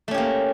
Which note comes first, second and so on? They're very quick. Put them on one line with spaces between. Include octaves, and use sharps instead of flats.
A3 C#4 G4 A#3